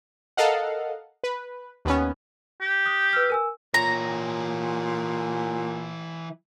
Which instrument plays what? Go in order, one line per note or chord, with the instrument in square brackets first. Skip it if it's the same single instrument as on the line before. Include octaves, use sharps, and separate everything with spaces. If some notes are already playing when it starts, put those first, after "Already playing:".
[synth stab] A4 A#4 D#5 F5 F#5
B4
D#2 B3 C#4
[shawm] G4
[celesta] D#6 F#6 G6
B4 E6 F6
A#4 G#5 E6
[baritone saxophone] A#2 [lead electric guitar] E3 C#5 [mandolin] A#5